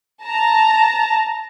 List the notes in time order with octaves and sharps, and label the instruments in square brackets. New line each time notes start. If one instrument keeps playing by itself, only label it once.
[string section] A5 A#5